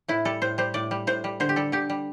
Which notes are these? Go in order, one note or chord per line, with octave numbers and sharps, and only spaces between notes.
A2 E4
G3 A4
A2 C5
G3 C5
A2 D5
G3
A2 C5
G3
D3 C5
G4
G3 A4
D3 G4
G3